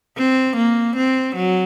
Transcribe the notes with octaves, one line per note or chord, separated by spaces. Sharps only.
C4
A#3
C4
F#3